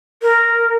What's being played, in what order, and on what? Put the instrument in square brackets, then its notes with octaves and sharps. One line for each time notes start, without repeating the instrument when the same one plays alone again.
[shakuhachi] A#4